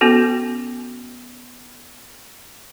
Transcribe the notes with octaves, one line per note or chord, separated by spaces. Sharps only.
B3 C#4 F#4 A4